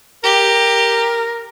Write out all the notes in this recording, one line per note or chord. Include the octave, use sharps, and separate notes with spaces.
G4 A#4